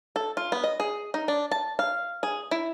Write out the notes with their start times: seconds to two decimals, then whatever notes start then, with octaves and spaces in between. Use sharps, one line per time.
0.16 A4
0.37 F4
0.52 B3
0.64 D#5
0.80 G#4
1.14 D#4
1.28 D4
1.51 A5
1.79 F5
2.23 G#4
2.51 E4